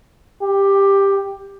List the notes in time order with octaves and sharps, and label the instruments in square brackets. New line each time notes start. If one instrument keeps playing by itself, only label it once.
[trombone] G4